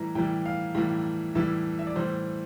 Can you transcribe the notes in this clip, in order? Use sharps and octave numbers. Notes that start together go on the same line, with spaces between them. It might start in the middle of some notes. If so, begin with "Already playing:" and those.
Already playing: A2 E3 G3 A#5
A2 E3 G3 G5
F5
A2 E3 G3
A2 E3 G3 E5
E5
D5
A2 E3 G3 C5